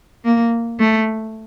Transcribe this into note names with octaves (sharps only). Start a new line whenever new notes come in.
A#3
A3